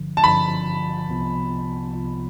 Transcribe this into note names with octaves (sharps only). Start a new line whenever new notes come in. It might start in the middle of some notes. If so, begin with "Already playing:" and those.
Already playing: G1 G2 D3 F3
A5
G1 G2 D3 F3 B5
C2 C3 F3 B3 F4
C2 C3 F3 B3 F4